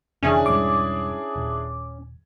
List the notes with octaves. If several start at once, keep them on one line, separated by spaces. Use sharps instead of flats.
F1 D3 E3 C#4 D4 E4 G#4
E1 G#2 G3 D6
D#1